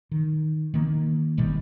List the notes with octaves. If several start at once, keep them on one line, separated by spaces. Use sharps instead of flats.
D#3
D#3 A#3
G1 B2 D#3 G3